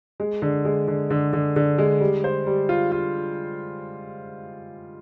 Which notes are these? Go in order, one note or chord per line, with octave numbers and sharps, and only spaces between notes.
G#3
D3
G#3
D3
D3
D3
D3
G#3
G3
C5
G3
F4
F4